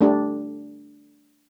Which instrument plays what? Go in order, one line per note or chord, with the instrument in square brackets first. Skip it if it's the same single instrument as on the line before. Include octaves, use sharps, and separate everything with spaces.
[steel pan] A3 D4 G4